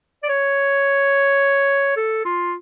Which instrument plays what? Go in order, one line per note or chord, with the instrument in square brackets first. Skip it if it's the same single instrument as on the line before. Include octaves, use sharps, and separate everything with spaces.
[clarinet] D5
C#5
A4
F4